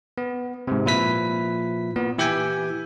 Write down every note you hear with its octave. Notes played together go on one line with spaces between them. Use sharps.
B3
G#2 C3
A#2 F3 E4 B4 B6
A#2 B3
E3 G4 E5 G5 G#5